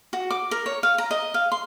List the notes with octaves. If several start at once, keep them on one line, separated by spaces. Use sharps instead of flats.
F#4
D6
A#4
C#5
F5
A#5
D#5
F5
C6